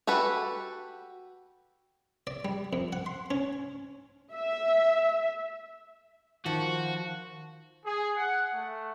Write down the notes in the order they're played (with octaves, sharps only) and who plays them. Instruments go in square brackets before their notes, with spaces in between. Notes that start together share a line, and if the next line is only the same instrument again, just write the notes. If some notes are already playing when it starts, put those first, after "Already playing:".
[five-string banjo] F#4 G4 A4 B4
[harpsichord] D5
G3
F2
F#5
C6
C#4
[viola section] E5
[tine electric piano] D#3 [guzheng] F3 [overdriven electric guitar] F#4
[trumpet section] G#4
F#5
A3